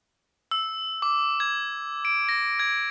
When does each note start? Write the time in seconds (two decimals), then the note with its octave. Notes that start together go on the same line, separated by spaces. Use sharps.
0.51 E6
1.02 D6
1.40 G#6
2.05 D7
2.29 A#6
2.59 G#6